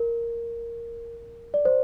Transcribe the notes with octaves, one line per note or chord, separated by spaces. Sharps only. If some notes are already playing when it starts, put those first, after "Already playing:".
Already playing: A#4
D5
C5